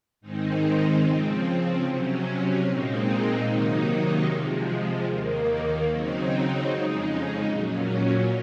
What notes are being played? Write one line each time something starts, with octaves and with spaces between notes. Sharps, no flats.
G#2 D#3 G#3 C4 D#4
C#3 F3 C4
C3 F#3 C#4
A#2 G#3 C4 D#4
C3 D#3 F#3 A#3 D#4
C3 F3 G#3
D#2 D#3 A#3
C#3 F#3 C4 D#4
F2 C#3 G#3 D#4
A#2 F#3 C#4